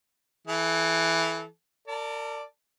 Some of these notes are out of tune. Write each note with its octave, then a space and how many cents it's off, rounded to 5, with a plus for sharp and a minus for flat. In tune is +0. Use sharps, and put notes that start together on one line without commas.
E3 +0 A4 -35
A#4 -35 D5 +0 A5 +0